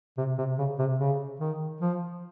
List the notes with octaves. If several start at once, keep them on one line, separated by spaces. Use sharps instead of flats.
C3
C3
C#3
C3
C#3
D#3
F3